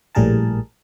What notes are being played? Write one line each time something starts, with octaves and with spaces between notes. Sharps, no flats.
A#1 A2 G3 G#4 A#4 A5